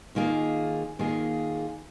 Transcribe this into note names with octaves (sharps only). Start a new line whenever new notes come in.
D#2 D#3 A#3 F4 G#4
D#2 D#3 A#3 F4 G#4